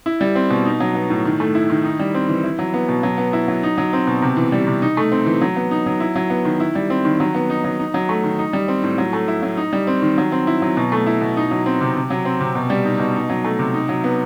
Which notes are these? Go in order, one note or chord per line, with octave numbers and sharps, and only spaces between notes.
E4
G3
C4
B2
D#4
F#3
B3
A2
D#3
A3
E4
D#3
D#4
G3
C4
E3
E4
F#3
B3
B2
F#3
B3
E4
F#3
D#4
F#3
C4
B2
C3
E3
G3
C3
D#4
A3
C4
E3
F#3
B3
D#4
F#3
E4
F#3
B3
D#3
E4
G3
C4
D#3
F#3
B3
D#4
F#3
D#4
F#3
A3
D#3
D#4
G3
C4
A2
F#3
A3
E4
F#3
D#4
G3
C4
D#3
F#3
C4
E4
F#3
B2
A3
E4
B2
D#4
F#3
C4
C3
C3
F#3
C4
C3
B2
G3
D#4
B2
D#4
F#3
A3
C3
D#4
F#3
B3